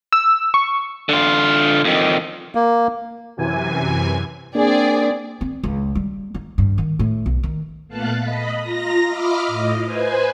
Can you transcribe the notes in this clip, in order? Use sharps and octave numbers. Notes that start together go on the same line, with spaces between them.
E6
C#6
D3 F4
F2 D#3
A#3
F#2 C3 E3 G#5
A#3 C4 D4 G#4 D5
C4
C#2
G3
D#4
G2
D#3
A2
B1
D#3
A#2 A3 B3 F5 A5 F#6
D#5 B5
F4 A#5 A#6
F4 D#5 E5 B5 D6 F6
A2 D#5
B4 C5 G#5